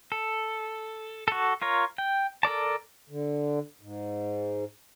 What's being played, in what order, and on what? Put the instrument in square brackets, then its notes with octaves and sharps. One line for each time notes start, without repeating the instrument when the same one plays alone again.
[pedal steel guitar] A4
F#4 A4
F4 A#4 C#5
G5
A4 A#4 D5 A5
[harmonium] D3
G#2